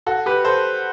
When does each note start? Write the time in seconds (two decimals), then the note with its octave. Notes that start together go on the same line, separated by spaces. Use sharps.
0.07 F#4 A4
0.26 G4 B4
0.45 A4 C5